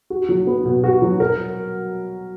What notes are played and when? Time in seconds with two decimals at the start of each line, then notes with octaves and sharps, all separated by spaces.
0.10 F#4
0.29 F#3
0.47 B3
0.65 B2
0.84 F#4
1.02 F#3
1.20 A#4